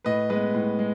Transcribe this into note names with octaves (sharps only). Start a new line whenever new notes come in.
A2 B4 D#5
G#3 B3 B4 D#5
A2
G#3